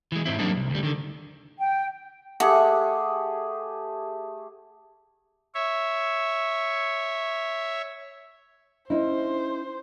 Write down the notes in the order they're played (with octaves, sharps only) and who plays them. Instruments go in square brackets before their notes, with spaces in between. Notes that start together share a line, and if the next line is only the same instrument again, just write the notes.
[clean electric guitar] E3 G#3
G#2 C4 E4
F#3 G3 A#3 C4 D4 D#4
C2
D2 G3
D3 D#3
[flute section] G5
[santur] A3 G4 G#4 [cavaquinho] F#5
[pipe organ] C#5 E5
[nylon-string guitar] C#4 D#4 E4 [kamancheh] C5